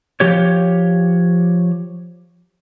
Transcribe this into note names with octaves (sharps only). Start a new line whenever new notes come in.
F3 G4 C#5